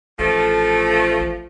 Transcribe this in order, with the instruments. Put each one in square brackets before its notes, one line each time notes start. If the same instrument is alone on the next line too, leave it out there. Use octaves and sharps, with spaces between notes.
[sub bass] A1 [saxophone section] F3 A3